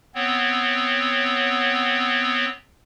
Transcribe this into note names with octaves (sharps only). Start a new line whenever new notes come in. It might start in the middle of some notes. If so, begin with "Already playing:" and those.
B3 C4 C#5